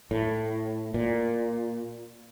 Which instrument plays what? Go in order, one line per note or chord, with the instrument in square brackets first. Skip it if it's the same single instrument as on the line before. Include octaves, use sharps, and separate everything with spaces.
[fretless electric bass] A2
A#2